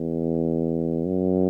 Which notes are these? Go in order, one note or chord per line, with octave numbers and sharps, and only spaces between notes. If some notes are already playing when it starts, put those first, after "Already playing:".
Already playing: E2
F#2